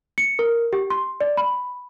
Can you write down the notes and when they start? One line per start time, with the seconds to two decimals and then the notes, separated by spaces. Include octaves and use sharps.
0.18 C#7
0.39 A#4
0.73 G4
0.90 C6
1.21 D5
1.37 B5